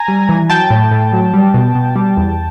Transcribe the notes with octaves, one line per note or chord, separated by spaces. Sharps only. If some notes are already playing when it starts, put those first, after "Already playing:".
Already playing: G#5 A#5
G3
E3
F#3 G5 A5
A2
A2
F#3
G3
B2
B2
G3
E2